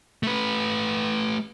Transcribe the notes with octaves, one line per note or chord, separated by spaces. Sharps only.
A3 B4